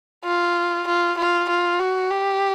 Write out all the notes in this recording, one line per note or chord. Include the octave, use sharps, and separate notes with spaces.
F4
F4
F4
F4
F#4
G4